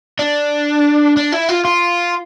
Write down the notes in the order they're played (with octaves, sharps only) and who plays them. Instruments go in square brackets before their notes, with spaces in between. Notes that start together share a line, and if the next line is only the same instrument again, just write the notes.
[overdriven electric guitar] D4
D4
E4
F4
F4